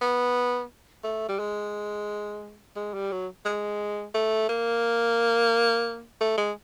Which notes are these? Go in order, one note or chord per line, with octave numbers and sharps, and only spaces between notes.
B3
A3
G3
G#3
G#3
G3
F#3
G#3
A3
A#3
A3
G#3